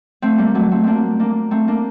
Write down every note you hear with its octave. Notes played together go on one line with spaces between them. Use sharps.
A3 C4
G3 A#3
F#3 A3
A3 C4
A#3 C4 D4
A#3 D4
A3 C4
A#3 D4